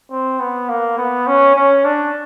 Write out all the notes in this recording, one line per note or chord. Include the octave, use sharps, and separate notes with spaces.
C4
B3
A#3
B3
C#4
C#4
D4